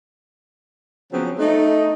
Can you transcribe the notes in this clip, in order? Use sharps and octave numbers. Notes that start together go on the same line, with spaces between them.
C#3 F3 F#3 B3 C4
A3 D#4